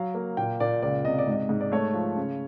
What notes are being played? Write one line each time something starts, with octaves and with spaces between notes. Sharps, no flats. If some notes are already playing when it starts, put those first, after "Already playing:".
Already playing: F#3 F5
A#3
A#2 G5
A#2 D5
C#2 D5
C3 D#5
D5
G#2 D#5
G#2
D5
A3 C#5
F3
C#3